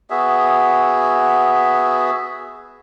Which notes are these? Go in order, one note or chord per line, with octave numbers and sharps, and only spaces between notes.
B3 F#4 G#4 E5